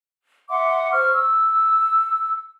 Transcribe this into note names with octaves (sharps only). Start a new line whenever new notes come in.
E5 F#5 C6 D6
C5 C#6 F6
E6